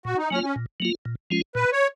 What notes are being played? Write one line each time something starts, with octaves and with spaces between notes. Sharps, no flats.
A#2 F#4
D#4
F#3 A#3 C#4 F4
C#4
A#2
F#3 A#3 F4
A#2
F3 G#3 C#4 F4
A#2 B4
C#5